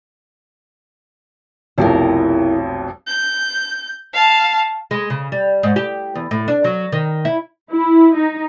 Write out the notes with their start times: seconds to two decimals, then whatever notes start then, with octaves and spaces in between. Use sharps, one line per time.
1.78 F1 B1 F2 E4 G4 A#4
3.08 G6
4.13 F5 A5
4.91 G#3
5.10 C#3
5.32 G3
5.63 G#2
5.76 G4
6.15 E2
6.31 A2
6.48 D4
6.64 F#3
6.92 D#3
7.25 E4
7.71 E4
8.16 D#4